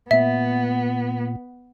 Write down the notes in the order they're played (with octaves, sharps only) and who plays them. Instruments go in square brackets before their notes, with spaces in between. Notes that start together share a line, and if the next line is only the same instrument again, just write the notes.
[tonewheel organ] A#2 [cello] B3 [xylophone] E5